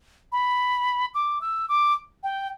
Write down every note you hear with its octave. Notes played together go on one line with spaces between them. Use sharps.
B5
D6
E6
D6
G5